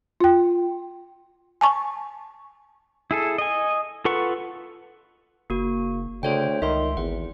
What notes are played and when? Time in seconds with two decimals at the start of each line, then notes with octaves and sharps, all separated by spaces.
0.20 F4 G5
1.61 G#5 A5 C#6
3.11 E4 G#4 A4
3.38 D#5 G#5
4.05 F4 A4 B4 F#5 C#6
5.50 F#1 A#3 F#4
6.23 D2 C#3 C5 C#5 G5
6.62 C#2 D#3 E5 C6
6.97 G#1 E2 F#5